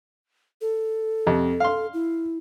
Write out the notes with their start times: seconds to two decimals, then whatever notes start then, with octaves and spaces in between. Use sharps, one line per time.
0.61 A4
1.27 F2 C3
1.60 F5 C6
1.94 E4